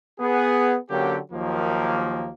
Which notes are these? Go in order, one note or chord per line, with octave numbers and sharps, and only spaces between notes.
B3 G#4
D3 F#3 A#3 C#4 G4
D#2 D#3 F3 F#3 A#3